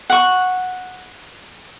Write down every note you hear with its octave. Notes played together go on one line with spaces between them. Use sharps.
F#5 C#6